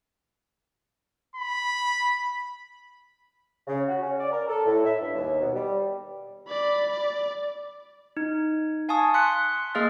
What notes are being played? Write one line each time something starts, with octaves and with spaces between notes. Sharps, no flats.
B5
C#3
F#4
C#4
D5
A#4
A4
A2
E5
G2
D#2
B2
G3
D5 B5
D5
D#4
F5 G#5 A5 C#6 D#6
C6 F#6 B6 C#7
A#3 G#4 D#5 F5 F6 A6